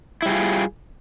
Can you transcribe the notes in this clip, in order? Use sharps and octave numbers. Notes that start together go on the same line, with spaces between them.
G3 E4 F4 G#4